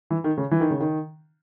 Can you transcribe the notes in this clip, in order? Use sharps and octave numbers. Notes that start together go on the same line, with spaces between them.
E3
D#3
C#3
E3
D#3
C#3
D#3